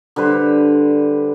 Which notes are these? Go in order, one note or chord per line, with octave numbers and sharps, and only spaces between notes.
D3 G3 B4 C5